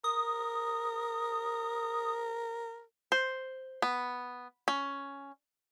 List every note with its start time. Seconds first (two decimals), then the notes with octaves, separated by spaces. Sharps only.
0.04 A#4 D#6
3.12 C5
3.82 B3
4.68 C#4